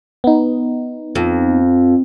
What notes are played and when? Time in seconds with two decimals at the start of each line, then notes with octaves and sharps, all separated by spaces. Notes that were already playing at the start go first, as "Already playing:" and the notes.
0.24 B3 D#4
1.15 F2